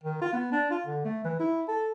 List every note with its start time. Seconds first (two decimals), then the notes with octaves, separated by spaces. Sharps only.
0.04 D#3
0.22 F4
0.33 B3
0.52 D4
0.71 F4
0.87 D3
1.05 A3
1.24 E3
1.40 E4
1.68 A4